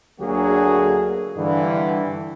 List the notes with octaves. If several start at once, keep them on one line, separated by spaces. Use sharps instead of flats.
D2 D3 F#3 A#3 F#4 G#4
G2 D3 E3